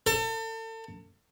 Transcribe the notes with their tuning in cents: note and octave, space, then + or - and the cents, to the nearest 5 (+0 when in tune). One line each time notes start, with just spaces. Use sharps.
A4 +35